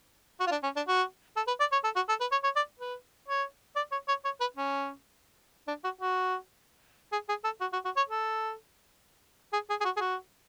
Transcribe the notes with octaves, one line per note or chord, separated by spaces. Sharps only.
F#4
F4
D4
C#4
D4
F#4
A4
B4
D5
C#5
A4
F#4
A4
B4
C#5
C#5
D5
B4
C#5
D5
C#5
C#5
C#5
B4
C#4
D4
F#4
F#4
G#4
G#4
A4
F#4
F#4
F#4
C#5
A4
G#4
G#4
G#4
F#4
G#4
F#4